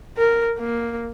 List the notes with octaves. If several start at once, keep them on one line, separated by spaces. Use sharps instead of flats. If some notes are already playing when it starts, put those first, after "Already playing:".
A#4
A#3